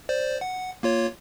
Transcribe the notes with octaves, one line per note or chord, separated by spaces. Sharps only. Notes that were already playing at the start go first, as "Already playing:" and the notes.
C5 D5
F#5
A#3 F4 C#5